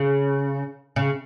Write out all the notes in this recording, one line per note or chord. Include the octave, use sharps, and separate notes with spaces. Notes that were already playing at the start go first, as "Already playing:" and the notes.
Already playing: C#3
C#3